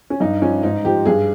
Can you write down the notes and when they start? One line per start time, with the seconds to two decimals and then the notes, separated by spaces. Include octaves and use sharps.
0.10 C#4
0.20 G2 D#4
0.42 F3 C#4
0.63 G#2 D#4
0.84 F3 G4
1.05 G2 G#4